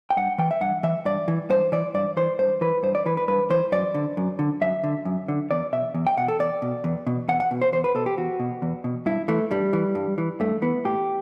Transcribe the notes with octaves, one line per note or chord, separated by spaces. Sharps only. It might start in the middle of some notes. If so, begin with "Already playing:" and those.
G5
G2 F#5
E3 G5
E5
G2 F#5
E3 E5
G2 D5
E3
G2 C5
E3 D5
G2 D5
E3 C5
G2 C5
E3 B4
G2 C5
D5
E3 B4
B4
G2 B4
E3 C5
F#2 D5
D3
F#2
D3
F#2 E5
D3
F#2
D3
E2 D5
B2 E5
E2
G5
B2 F#5
A4
E2 D5
B2
E2
B2
E2 F#5
F#5
B2
C5
E2 C5
B4
B2 A4
G4
E2 F#4
B2
E2
B2
G2 E4
E3 A3
G2 G3
E3
G2
E3
G2 A3
E3 B3
A2 G4